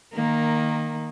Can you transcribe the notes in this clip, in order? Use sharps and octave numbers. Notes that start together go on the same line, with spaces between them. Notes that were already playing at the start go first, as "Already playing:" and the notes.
D#3 A#3